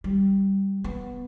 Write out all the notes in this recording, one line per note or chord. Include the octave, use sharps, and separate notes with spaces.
G3
B3